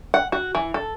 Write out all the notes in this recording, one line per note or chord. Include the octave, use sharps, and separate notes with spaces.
F#5
F#4
E3
A4